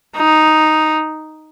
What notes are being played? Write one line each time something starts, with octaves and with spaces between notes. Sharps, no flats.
D#4